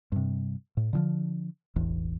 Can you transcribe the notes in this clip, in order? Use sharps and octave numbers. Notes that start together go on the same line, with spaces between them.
G2 C3
A2
D3 D#3 F3
E1 A1 E2